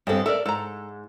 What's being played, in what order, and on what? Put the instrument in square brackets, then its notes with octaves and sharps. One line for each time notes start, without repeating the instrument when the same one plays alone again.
[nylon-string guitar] G2 C4 [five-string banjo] G#3 B3 A4
[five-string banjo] A4 A#4 D5 [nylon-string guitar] E5
[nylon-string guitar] G#2 [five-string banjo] A4 A#5